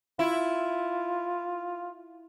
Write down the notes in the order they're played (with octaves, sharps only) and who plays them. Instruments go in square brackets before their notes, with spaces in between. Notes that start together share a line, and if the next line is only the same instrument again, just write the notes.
[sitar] E4 [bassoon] F4